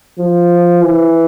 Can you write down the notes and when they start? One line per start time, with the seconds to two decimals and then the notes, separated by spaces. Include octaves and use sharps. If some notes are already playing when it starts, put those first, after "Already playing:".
0.19 F3
0.84 E3